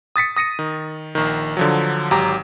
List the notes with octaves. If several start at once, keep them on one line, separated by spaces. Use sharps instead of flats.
D#6 A6 B6 C#7
D#6 A#6 C#7 D#7
D#3
A#1 D#3
D3 F3 F#3
G#1 F#3 G4 A#5 D6